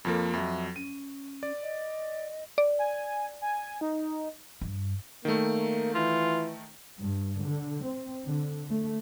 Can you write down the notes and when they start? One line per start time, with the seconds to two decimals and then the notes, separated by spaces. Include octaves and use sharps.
0.05 F2 F3 A#3 A4
0.33 F2 F#3 E5
0.76 C#4 D#7
1.43 D5
1.62 D#5
2.58 D5
2.79 G#5
3.42 G#5
3.81 D#4
4.61 G2
5.25 D#3 A3 A#3
5.95 E3 F4
7.00 G2
7.40 D3
7.82 C4
8.26 D3
8.69 A3